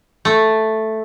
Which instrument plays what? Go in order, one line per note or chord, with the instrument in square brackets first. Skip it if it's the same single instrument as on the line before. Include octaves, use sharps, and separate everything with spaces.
[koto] A3